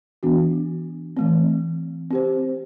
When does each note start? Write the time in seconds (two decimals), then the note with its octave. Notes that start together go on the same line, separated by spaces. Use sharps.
0.23 E3 B3 D4 F#4
1.17 E3 A3 C4
2.11 C4 G4 C5